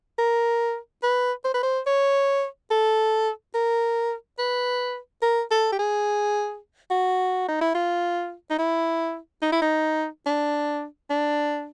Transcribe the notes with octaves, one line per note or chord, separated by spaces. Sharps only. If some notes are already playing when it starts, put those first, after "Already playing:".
A#4
B4
C5
B4
C5
C#5
A4
A#4
B4
A#4
A4
G4
G#4
F#4
D#4
E4
F4
D#4
E4
D#4
E4
D#4
D4
D4